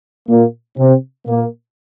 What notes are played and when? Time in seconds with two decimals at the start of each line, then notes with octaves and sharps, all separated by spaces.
0.29 A#2 A#3
0.78 C3 C4
1.27 A#2 A#3